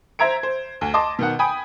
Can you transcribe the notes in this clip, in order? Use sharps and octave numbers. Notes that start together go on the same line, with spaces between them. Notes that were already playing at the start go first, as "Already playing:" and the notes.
C5 E5 A#5 G#6 D7
C5
D2
D#5 A5 C6 D6
B2 D#3 F#5
G5 G#5 B5 D#6